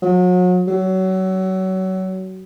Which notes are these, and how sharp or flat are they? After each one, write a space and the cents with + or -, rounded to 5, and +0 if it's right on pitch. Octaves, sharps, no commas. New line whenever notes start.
F#3 -35
F#3 +25